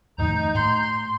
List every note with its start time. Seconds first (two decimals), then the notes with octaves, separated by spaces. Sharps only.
0.18 F2 A2 D#3 D#4 A#5 G6
0.55 A2 C6